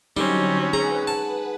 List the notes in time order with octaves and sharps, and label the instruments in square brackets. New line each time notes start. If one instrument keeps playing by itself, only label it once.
[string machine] D3 F#3 C#5 [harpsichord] G3 [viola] C4 C#4 [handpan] D#4
[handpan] G#4 [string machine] B4 F#5 [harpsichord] A#5
[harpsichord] A5